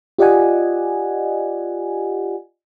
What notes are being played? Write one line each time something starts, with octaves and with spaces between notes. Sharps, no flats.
F4 G4 D5 D#5 F#5 G#5